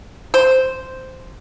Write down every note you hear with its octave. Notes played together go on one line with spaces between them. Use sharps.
C5